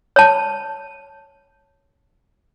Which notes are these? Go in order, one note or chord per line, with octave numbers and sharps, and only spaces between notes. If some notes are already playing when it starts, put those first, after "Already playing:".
C#5 A5